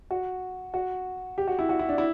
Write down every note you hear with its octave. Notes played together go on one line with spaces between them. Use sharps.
F#4
F#4
G4
F#4
E4
F#4
E4
D4
E4